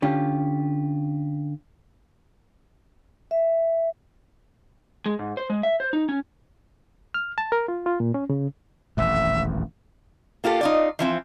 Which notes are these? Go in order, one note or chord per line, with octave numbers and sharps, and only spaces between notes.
D3 C#4 F4 G4
E5
G#3
G#2
C5
G#3
E5
C5
D#4
C#4
F6
A5
A#4
F4
F4
A#2
C#4
C#3
D#1 A1 F2 E5
A#3 F4 G4 A4
D#4 F4 D5
E3 F3 C4